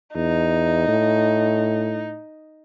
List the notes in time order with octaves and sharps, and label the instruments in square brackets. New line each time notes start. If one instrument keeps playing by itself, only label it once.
[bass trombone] E2 [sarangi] D#4
[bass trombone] A2